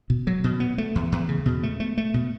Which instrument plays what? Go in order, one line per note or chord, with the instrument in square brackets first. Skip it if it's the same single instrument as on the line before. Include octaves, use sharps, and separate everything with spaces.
[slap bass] B2
F#3
B2
B3
A3
E2
E2
C#3
B2
A3
A3
A3
B2